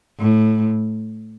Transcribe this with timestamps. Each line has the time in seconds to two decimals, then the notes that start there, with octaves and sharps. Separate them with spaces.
0.19 A2